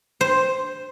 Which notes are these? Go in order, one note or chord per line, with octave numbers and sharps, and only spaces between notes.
C5